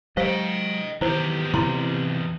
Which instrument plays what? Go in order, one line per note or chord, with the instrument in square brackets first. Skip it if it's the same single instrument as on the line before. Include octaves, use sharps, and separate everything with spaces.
[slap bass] F#3 G#3 [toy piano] G4 C5 F5 [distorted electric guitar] D#5 G5
[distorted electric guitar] E2 G4 [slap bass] D#3 [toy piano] E4 C5
[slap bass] C3 F3 [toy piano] E4 C6